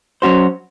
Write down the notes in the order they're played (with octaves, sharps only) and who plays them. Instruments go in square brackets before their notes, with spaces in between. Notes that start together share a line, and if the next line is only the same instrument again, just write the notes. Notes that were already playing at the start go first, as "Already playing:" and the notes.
[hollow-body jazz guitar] F#3 C#4 F#4 C5